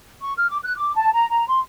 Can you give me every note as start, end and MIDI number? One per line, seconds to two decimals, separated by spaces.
0.20 0.32 85
0.36 0.47 89
0.49 0.58 86
0.63 0.75 90
0.76 0.95 86
0.95 1.11 81
1.12 1.26 82
1.31 1.46 82
1.48 1.60 84